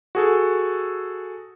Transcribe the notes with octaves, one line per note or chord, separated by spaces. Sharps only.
F#4 G#4 A4